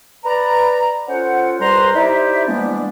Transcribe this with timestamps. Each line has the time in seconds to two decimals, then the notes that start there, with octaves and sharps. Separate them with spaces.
0.24 B4 D5 A#5
1.08 C#4 F4 A4 C5 F#5
1.59 C2 G3 B4 C5 A#5 C6
1.94 D#4 E4 G4 C5 D5 E5
2.47 E3 G3 G#3 A#3 B3 D4